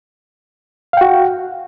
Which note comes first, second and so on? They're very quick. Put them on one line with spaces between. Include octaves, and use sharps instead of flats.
F5 G5 F#4